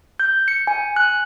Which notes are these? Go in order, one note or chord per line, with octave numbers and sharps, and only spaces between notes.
G6
C#7
G#5
F#6